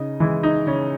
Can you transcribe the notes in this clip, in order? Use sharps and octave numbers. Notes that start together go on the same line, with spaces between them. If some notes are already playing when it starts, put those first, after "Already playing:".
Already playing: C#3 D#4 D#5
E3 G#3 E4
D#4
C#3 C#4